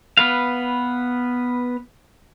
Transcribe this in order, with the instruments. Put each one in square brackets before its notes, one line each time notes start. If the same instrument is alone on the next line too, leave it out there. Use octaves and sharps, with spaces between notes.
[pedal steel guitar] B3 B4 F5